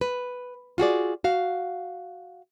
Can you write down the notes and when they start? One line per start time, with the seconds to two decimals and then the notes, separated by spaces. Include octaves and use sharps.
0.01 B4
0.78 F4 F#4 G#4 D5
1.24 F#4 F5